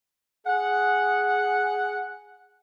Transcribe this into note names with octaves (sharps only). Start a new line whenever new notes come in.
G#4 F#5